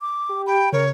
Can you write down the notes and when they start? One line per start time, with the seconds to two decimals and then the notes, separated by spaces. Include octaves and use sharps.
0.01 D6
0.29 G4
0.47 G5 B5
0.73 C#3 A#4 C#5